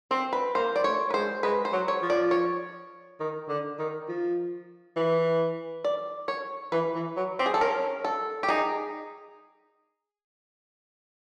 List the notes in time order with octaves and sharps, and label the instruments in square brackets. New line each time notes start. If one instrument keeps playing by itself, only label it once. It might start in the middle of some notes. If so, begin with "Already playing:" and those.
[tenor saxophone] C4 [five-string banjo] C5
[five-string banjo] B4
[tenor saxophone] A#3 [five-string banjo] C5
[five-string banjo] D5
[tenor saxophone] A3 [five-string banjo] C#5
[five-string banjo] B4
[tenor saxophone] G#3 [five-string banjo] C5
[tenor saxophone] G#3 [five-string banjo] B4
[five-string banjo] C5
[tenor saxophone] F#3
[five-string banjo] C#5
[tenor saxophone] F3
[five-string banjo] D5
C#5
[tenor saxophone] D#3
D3
D#3
F3
E3
[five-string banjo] D5
C#5
[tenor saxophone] E3 [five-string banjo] B4
[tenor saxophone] E3
F#3
[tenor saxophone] C4 [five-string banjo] G4
[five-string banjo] G#4
A4
[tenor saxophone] C#4 [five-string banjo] A#4
[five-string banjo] A4
G4
[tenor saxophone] D#4 [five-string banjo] G#4